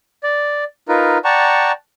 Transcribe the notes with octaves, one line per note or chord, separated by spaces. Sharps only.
D5
D#4 F4 A#4 B4
D5 F#5 G5 A5 A#5 C#6